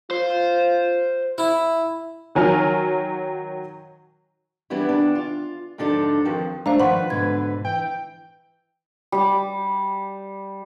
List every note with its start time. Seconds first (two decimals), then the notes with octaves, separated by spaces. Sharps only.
0.11 F4 C5
1.38 E4
2.35 D#3 F#3 G#5 F6
4.70 E3 G3 B3 D4 E4
4.89 D#3 D4
5.15 F4
5.78 G#2 D3 F3 D4 D#4 A4
6.25 F2 D#3 F3 C5
6.66 A3 D4 C5 F5 A#5
6.80 D#3 F3 B4 F#5 C6 C#6
7.10 G#2 B2 D3 G#6
7.65 E3 G5
9.12 G3 D6